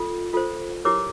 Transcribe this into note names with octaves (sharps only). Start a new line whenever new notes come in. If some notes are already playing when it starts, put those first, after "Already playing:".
Already playing: F4 A4
F4 A4 C5
E4 G4 A#4 C#5 D6